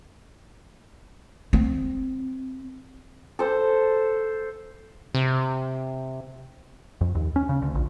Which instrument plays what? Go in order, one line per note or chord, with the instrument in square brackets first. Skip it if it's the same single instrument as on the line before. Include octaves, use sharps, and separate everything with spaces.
[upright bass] C4
[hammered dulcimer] A4 C5
[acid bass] C3
[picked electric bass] F2
D#2
C#4
C#3
D2
A#1